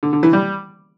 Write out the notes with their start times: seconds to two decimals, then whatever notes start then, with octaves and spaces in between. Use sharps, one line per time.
0.03 D3
0.13 D3
0.23 E3
0.33 G3